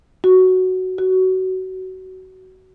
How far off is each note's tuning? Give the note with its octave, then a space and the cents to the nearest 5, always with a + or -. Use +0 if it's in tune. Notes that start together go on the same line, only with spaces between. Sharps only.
F#4 +5
F#4 +20